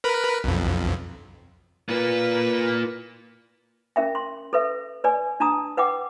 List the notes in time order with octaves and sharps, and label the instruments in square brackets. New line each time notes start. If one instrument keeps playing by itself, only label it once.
[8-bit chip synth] A#4 B4 B5
B1 F2
[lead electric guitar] A#3 F4 [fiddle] B4
[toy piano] C#4 A#4 E5 G5
C6
A4 B4 E5
B4 D5 G#5
D4 A5 A#5 D#6
B4 F#5 G5 D6